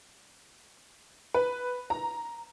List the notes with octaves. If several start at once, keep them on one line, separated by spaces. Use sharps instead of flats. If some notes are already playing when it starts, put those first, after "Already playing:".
B4
A#5